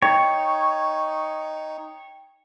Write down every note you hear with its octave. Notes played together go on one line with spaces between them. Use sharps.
D#4 C#5 G5